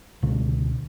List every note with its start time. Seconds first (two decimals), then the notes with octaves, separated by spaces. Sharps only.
0.23 C#2 B2 D3